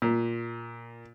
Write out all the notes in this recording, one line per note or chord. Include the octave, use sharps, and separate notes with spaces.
A#2